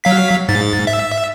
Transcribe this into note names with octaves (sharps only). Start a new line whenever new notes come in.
F#3 F5 B6
G#2 A6
E5